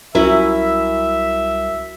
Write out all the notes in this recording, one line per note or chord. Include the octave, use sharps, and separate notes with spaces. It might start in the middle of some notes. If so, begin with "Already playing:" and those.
C2 F#3 C#4 E4 A#4 E5